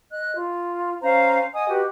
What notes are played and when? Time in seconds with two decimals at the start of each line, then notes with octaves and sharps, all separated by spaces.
0.11 D#5 F#6
0.35 F4
1.02 C#4 C5 F5 A#5
1.54 D#5 F#5 G#5 D#6
1.68 F#4 G4 B4 D#5